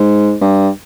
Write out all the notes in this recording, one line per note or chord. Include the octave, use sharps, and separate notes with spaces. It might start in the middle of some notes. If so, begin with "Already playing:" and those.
Already playing: G#2
G2